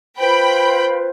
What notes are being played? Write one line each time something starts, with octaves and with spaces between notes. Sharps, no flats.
F4 B4 C5 G5 B5